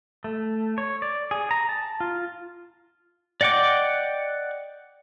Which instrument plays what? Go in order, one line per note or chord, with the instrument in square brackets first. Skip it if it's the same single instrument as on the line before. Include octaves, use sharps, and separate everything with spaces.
[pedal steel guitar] A3
C#5
D5
G#4
A#5
A5
F4
D5 D#5 F#5 G5 D6